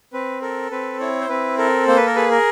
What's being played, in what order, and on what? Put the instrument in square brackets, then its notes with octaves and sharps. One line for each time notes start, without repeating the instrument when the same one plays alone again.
[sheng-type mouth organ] C4 B4
A4 A#4
C4 B4
E4 C#5
C5
C4 B4
A4 A#4
A#3 C5
B4
A#4
G#4 B4
A#4